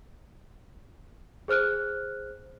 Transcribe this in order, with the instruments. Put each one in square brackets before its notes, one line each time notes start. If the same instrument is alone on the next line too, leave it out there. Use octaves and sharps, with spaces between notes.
[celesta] G#4 C5 F6 F#6